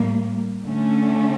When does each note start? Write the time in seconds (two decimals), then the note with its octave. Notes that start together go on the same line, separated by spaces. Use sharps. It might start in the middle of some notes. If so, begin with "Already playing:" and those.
Already playing: A2 G3 A#3
0.64 D3 A3 C#4